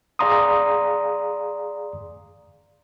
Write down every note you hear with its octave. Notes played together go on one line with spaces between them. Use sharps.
G#4 D5 F5 A#5 C6 D#6